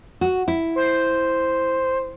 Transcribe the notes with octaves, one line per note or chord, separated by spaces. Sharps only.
F#4
E4
C5